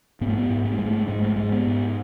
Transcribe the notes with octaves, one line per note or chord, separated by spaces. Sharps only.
G#2 B3
A3
B3
G#2
B3
A3
G#2 G#3
A3
G#2 G#3
A3
G#2 G#3
B3
G#2